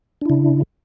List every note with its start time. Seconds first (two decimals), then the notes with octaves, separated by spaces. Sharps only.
0.21 D4
0.26 E4
0.30 C#3